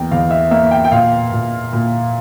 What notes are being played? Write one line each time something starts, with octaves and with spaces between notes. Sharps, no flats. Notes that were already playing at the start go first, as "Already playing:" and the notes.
Already playing: E2 A#3 G5
E2 F5
E5
A#3 E5
G5
G5
A#2 F5
A#2
A#2